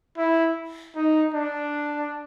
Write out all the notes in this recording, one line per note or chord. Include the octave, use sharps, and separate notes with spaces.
E4
D#4
D4